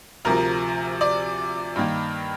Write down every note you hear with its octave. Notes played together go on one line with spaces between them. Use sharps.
D2 C3 F3 A#4
D5
G2 D#3 A#3